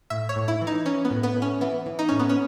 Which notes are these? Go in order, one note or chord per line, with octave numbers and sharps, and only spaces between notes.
A2 E5
C#5
A2
E4
E3
D#4
E3 C#4
B3
A2
B3
A2
C#4
E3 B3
E3
D#4
A2 C#4
B3
C#4